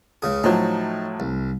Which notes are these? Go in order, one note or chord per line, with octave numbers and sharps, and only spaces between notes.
C#2 C#3 G#4
A2 F3 F#3 D#4
C2